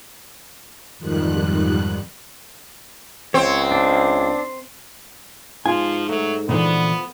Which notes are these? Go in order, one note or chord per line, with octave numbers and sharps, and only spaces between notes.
F2 G#2 D#3 F3 G3 F#6
C#2 C4 C#5
D4
G#2 F3 F4 G#5
F#3 A3
A#2 D3 E3 F3 B3